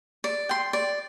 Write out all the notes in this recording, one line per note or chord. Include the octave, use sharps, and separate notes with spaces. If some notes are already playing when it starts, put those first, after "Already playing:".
D5
G5 C6
D5